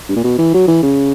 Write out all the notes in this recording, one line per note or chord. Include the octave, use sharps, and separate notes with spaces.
G2
A#2
B2
E3
F#3
E3
C#3